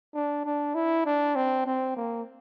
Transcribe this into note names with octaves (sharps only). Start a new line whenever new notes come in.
D4
D4
E4
D4
C4
C4
A#3